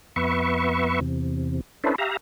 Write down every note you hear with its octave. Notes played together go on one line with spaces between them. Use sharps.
F2 B3 B4 E5 C#6
E2 C3
C#4 D4 E4 A4 B4 C5
G4 E5 F5 A#5